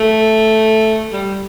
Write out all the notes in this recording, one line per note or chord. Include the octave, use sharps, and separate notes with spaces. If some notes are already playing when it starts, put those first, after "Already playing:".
Already playing: A3
G3